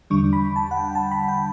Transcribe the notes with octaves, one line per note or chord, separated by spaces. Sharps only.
E2 D3 G3 D4 C#6
B5
A5
F#5
G5
A5
B5
G5